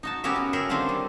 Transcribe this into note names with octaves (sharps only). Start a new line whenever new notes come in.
D#4 F#4 A5
B3 C#4 F#4 G4 A#4 E5
F#4
G#4 A#4 C#5 E5 G5
D#3 C4 D4 F4 G4 A4
G3